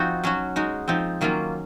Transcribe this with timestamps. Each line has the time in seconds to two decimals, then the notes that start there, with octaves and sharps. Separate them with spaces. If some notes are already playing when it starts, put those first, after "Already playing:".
Already playing: F3 C4 D#4 F#4
0.24 F#3 C#4 F#4
0.56 G#3 D#4 F#4
0.88 F3 C4 D#4
1.21 D#3 F#3 A#3 C#4 F4